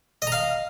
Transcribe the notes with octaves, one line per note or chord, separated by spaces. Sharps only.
D#5 F5 A#5